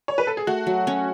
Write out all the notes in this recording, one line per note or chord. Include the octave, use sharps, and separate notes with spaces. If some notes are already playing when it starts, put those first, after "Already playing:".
C#5
B4
A4
G#4
A3 F#4
F#3
C#4